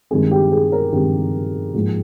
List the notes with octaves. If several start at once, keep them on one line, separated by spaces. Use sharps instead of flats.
G2 D#3 G#3 C4 G#4
G4
G#4
A#4
G2 D#3 G#3 C4 G4
G#2 F3 A#3